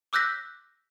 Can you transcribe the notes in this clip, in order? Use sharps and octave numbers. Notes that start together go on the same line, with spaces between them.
D6 E6 F#6 G6 A#6 B6